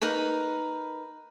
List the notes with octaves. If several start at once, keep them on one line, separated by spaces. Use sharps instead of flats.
D#4 A#4 B4 B5